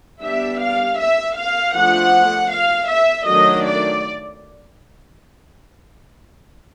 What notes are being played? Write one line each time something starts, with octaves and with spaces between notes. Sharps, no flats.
G3 B3 D4 E5
F5
E5
F5
F3 A3 D4 F#5
F5
E5
D#3 F#3 A3 D4 D#5
D5